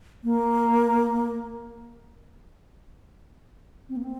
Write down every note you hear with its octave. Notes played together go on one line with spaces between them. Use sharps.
A#3
C4
A#3
C4